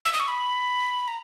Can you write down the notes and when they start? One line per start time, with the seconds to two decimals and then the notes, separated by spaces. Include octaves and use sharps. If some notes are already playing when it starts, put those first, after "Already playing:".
0.05 E6
0.13 D#6
0.20 C#6
0.28 B5
1.08 A#5